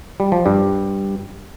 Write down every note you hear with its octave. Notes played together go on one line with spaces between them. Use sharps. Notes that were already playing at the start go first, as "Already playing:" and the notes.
G3
F3
G2 G3